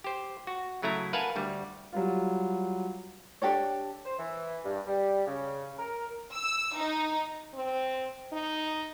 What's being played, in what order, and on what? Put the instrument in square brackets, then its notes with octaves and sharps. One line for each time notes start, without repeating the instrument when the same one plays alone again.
[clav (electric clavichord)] G4 C5
F#4
C#3 F#3 A3 E4 A#5
A#4 B4 F5 F#5 G#5 A5
D2 G3
[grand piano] F#3 G3 F4
[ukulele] D4 G4 A4 C#5
[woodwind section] C5
E3
G2
G3
C#3
A#4
[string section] E6
D#4
[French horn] C4
D#4